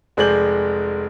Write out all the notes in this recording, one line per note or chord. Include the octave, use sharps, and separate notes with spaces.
F1 G#3 G#4 D5 G6 F#7